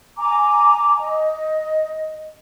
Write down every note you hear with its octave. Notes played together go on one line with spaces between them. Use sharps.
G#5 A#5 D6
D#5